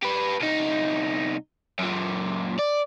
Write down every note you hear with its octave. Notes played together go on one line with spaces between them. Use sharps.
G4 B4
C2 D#4
F#2 A#2
D5